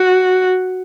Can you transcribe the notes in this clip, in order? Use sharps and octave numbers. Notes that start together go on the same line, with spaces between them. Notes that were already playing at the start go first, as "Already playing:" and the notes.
Already playing: F#4